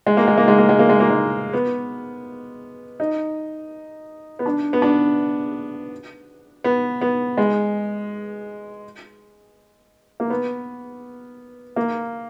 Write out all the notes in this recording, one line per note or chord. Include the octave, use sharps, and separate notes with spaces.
G#3
A#3
G#3
A#3
G#3
A#3
G#3
A#3
G#3
A#3
G#3
B3
D#4
B3
D4
B3
D4
B3
B3
G#3
A#3
B3
A#3